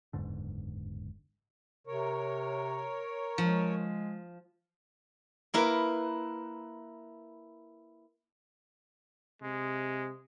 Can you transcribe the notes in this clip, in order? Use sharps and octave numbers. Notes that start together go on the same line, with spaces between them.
F#1 E2 G#2 D3
C3 A#4 C#5
F3 G#3
A#3 E4 A#4 B4
C3 G#3